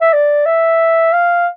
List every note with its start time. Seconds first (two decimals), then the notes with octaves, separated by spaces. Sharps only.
0.01 E5
0.13 D5
0.46 E5
1.13 F5